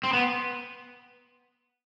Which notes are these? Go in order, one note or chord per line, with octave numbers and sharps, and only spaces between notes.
C4
B3